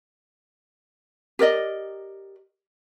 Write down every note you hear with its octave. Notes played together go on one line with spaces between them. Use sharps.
G4 A#4 D5 D#5